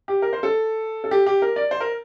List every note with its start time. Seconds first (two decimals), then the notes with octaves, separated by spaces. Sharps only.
0.08 G4
0.22 A#4
0.33 C5
0.43 A4
1.04 A4
1.11 G4
1.26 G4
1.42 A#4
1.56 D5
1.71 C5
1.80 A#4